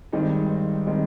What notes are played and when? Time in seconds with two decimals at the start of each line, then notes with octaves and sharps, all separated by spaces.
0.12 G2 D#3 G#3 C4 D#4
0.87 D#3 G#3 C4 D#4